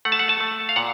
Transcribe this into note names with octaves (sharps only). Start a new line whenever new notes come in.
A3 F#5
A5
F#5
A5
A3
F5
A#2 F#5